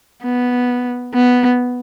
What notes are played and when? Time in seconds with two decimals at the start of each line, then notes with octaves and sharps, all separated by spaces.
0.23 B3
1.14 B3